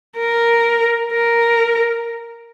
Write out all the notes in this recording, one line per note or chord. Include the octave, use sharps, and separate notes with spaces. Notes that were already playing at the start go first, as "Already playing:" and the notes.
A#4
A#4